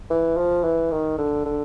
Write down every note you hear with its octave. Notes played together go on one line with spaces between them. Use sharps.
E3
F3
E3
D#3
D3
D3